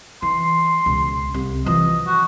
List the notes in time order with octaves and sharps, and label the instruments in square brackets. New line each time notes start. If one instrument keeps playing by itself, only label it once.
[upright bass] E3 [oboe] C6
[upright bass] C#2 B2
C2
[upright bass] E3 F3 [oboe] D#5
[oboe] F#4